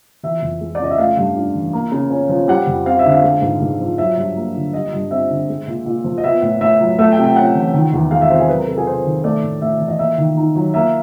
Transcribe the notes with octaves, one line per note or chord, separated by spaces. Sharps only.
E3 E5
F2
G#3
D5
C#3 D#5
E5
A3 F5
G2
D4
E3
A#3
C#3
C#4
F3
G3 F#5
F2
C4 F5
E5
D3
F5
G#3
G#2
G#2
F3
F#3 E5
G2
A#3
D3
G3 D#5
G2
C4 E5
D3
G#3
A#2
A#2
F3
D#5
B3 E5
A2
A2 E5
F#3
A3 E5
G5
C3
G5
C#4 F#5
E3
D#3
E2
G#3 F5
E5
C3 C5
G#4
F#3 B4
A#4
C3 A4
G#4
C3 C5
D#3
A3 D5
A2
A2 E5
E3
D#5
A#3 E5
D#3
D#4
F#3
A#3 E5